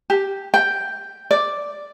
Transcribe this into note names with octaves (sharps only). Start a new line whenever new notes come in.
G4
G5
D5